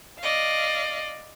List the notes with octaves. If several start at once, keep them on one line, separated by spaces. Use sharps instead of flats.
D5 D#5 F5